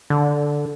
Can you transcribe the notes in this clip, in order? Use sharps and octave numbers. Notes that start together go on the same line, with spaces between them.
D3